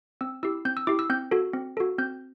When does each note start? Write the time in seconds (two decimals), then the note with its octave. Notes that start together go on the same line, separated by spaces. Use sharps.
0.21 C4 E6
0.43 E4 G4 E6
0.65 C4 G6
0.77 E6
0.87 E4 G4 D6
0.99 E6
1.10 C4 G6
1.31 F#4 A4
1.53 C4
1.77 F#4 A4
1.98 C4 G6